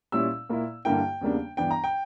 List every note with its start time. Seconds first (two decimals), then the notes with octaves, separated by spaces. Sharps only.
0.12 A#2 G3 C#4 E4 E6
0.50 A#2 A#3 E4
0.85 G2 D3 A#3 E4 G5
1.21 E2 C#3 G3 A#3 D4
1.57 G2 E3 B3 D4 G5
1.71 A#5
1.84 G5